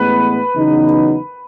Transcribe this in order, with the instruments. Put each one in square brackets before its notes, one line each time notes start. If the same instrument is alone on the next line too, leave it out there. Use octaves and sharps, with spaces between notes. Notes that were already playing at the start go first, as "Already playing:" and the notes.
Already playing: [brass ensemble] A1 A2 G#3 B3 [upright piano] B4
[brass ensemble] E2 C#3 F#3 B3 D#4